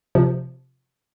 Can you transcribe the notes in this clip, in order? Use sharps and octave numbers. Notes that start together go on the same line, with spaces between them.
C3 F3